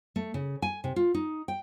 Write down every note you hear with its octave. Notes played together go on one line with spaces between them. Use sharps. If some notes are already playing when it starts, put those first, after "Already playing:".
A3
C#3
G#5
C3
F4
D#4
G5